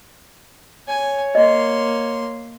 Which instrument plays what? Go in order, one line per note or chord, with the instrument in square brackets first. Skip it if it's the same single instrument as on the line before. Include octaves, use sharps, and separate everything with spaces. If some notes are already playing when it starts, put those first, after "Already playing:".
[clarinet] C#5 [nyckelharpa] G#5
[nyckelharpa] A#3 C6 [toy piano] D#5